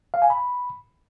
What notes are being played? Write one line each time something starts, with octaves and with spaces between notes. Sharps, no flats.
F5
G#5
B5